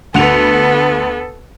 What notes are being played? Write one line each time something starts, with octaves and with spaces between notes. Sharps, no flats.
D2 B3 A4 F#5 F7